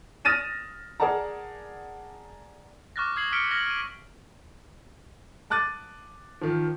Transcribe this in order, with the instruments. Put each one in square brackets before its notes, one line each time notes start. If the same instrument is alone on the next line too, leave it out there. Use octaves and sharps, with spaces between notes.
[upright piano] D#6 F6 A6 A#6 D#7 E7
G#4 A#4 D5 F#5 A5 A#5
[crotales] C#6 D6 F6 F#6 A6 A#6
D#6 G#6 C7 F#7
E6 F6 B6 C#7 D7 G7
F6 A#6 F#7
F6 D#7
[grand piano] A5 D6 F#6 A6 D#7
D#3 F3